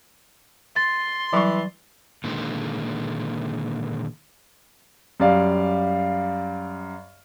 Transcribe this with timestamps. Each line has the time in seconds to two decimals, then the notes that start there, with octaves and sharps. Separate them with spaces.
0.76 C6 A6
1.33 E3 F#3 G3 C#6
2.24 A#2 D3 D#3 G#3
5.20 F#2 G3 D5 F5